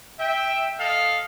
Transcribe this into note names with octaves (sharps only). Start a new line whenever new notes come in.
E5 G5
A4 D#5 F5